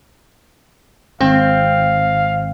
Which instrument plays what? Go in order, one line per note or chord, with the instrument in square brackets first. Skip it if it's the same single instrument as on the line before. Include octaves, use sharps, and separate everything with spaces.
[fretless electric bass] G#1 [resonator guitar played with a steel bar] C4 [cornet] F5